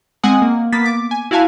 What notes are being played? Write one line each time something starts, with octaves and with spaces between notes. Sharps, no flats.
G#3 C4 F#5 G#5 D#6
A#3
A#3 B3 A6 B6
D6
G#5
E4 F#4 F5 G#5 A5